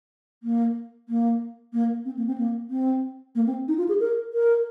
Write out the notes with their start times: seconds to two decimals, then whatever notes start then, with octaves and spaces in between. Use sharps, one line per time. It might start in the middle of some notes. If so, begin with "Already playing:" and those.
0.43 A#3
1.09 A#3
1.73 A#3
2.05 C4
2.17 A#3
2.27 C4
2.38 A#3
2.70 C4
3.35 A#3
3.47 C4
3.68 D#4
3.78 F4
3.89 G#4
4.00 A#4
4.33 A#4